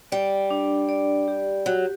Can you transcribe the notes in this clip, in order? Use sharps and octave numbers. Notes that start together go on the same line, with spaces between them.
G3 D5
D4
D5
G4
F#3 G4